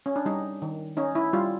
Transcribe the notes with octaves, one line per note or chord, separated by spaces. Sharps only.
C#4
D4
G3 D#4
D#3
C#4 D#4
E4
G3 F4